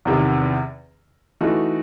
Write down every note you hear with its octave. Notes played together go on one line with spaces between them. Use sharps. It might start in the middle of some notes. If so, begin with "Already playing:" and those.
E2 C3 D#3
E3 A3 D#4 F#4